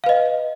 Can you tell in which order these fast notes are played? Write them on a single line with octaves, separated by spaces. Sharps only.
F5 B4 D#5